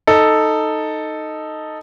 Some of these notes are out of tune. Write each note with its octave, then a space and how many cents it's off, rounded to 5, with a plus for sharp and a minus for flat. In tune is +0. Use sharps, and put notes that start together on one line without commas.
D#4 +0 A4 +0